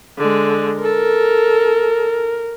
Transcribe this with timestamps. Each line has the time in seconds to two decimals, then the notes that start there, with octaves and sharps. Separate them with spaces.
0.18 D3 G#3
0.82 A4 A#4